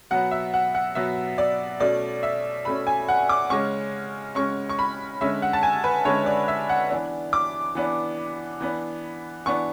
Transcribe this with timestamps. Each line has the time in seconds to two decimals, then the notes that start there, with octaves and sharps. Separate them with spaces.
0.10 B2 F#3 B3 F#5
0.31 E5
0.54 F#5
0.75 F#5
0.95 B2 F#3 B3 E5
1.38 D5
1.80 B2 A3 C#4 D5
2.23 E5
2.65 B2 A3 C#4 B5
2.87 G#5
3.09 F#5
3.29 D6
3.50 C#3 G#3 C#4 C#6
4.35 C#3 G#3 C#4 C#6
4.69 C#6
4.79 B5
5.21 D3 G#3 C#4 E5
5.42 F#5
5.53 A5
5.63 G#5
5.84 B4
6.05 D3 G#3 C#4 C#5
6.26 D5
6.48 E5
6.69 F#5
6.90 E3 B3 D4
7.33 D6
7.75 E3 B3 D4
8.61 E3 B3 D4
9.46 E3 B3 D4 C#6